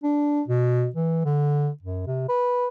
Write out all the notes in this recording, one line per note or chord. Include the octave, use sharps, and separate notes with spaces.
D4
B2
E3
D3
F#2
C3
B4